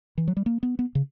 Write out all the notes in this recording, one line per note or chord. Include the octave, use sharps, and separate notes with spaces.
E3
F#3
G3
A#3
B3
B3
C#3